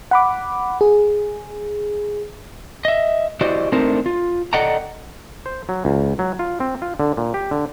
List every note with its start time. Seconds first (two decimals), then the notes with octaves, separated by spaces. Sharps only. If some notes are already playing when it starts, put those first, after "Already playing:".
0.11 F#5 B5 D6
0.81 G#4
2.85 D#5 E5
3.41 E4 F#4 G4 C5 D5 D#5
3.72 A3 C4 D4 D#4 A#4 C5
4.06 F4
4.53 A4 D5 D#5 F#5 G5 A#5
5.46 C5
5.69 F#3
5.85 C#2
6.19 F#3
6.39 F4
6.60 C4
6.82 F4
7.00 D3
7.17 A#2
7.34 G4
7.51 D3